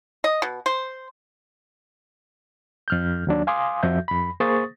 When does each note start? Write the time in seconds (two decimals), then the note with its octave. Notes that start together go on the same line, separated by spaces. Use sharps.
0.24 D#5
0.42 B2
0.66 C5
2.88 F2 F6 G6
3.27 D#2 F#3 D4
3.47 F5 G#5 C6 D6 D#6
3.83 F2 F3 F#4 E5 G6
4.08 F2 B5
4.40 A#3 G#4 C5 C#6 D#6 A6